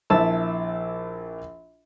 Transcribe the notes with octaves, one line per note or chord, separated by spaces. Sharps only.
A#1 E4 A5 E6